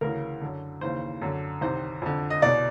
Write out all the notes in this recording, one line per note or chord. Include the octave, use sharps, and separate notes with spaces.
D2 C#3 E3 A#4
F#2 D3
D#2 C#3 E3 C5
F#2 D3
C2 C3 D#3 C5
F2 D3
D#5
C2 B2 D5